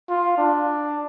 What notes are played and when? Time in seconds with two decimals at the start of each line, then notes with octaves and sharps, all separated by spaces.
0.09 F4
0.38 D4